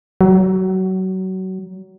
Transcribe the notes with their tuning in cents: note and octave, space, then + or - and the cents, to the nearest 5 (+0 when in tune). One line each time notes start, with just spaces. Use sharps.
F#3 +25